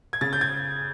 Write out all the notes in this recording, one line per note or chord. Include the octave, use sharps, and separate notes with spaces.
G#6
C#3 A6
G6
G#6